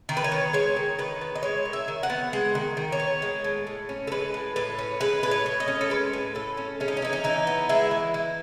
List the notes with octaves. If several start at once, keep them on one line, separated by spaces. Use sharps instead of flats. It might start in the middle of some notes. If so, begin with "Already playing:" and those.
D#3
B4
C#5
B3
G#3 C#5
D#3
D#3 B4
B3
D#5
G#3 C#5
D#3
E5
D#3
F#5
B3
G#3 F#5
D#3
D#3
C#5
B3
G#3
A2
A2
C#4
A4
G#3 B4
A2
A2 B4
C#4
G#3 B4
A2 B4
C#5
A2
D#5
C#4
A4
G#3 B4
A2
A2 A4
C#4
G#3 C#4
D#4
C#4
E3 D#4
C#4
E3 D#4
B3
G#3 E4
E3
E3